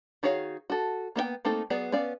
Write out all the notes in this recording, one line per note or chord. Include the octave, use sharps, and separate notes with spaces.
D#3 F#4 G#4 C#5 F5
F#4 A4
A#3 B3 D#5 G5
A3 A#3 C4 D#4 A4
F#3 B3 G#4 D5
B3 C#4 D5 F5